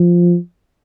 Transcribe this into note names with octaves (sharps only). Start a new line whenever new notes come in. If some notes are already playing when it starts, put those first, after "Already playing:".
Already playing: F3